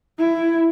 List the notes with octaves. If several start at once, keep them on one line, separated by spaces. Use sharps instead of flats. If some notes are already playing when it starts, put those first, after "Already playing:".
E4